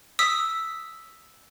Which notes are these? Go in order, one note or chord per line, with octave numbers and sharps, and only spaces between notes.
D#6 E6 B6